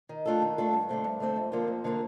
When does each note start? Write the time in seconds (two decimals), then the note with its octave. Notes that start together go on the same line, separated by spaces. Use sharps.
0.09 D#3
0.25 A3 D4 F4 A4
0.42 D#3
0.58 A3 D4 F4 A4
0.73 G2
0.89 D3 A3 C4
1.04 G2
1.20 D3 A3 C4
1.36 F2
1.52 D3 F3 A#3 F4
1.68 F2
1.84 D3 F3 A#3 F4